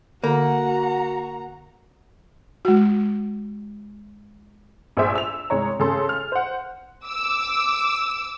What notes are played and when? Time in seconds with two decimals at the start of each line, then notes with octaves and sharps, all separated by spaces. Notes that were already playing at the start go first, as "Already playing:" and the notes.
0.24 D3 A#3 F#4 F#5 A#5
2.65 G#3 F#4
4.97 A#1 G#4 C5 E5
5.15 E6 F7
5.50 C2 G#3 C#5 A#5
5.80 C#3 G#4 A4 C6
6.09 F6
6.32 C5 F#5
7.06 D6 E6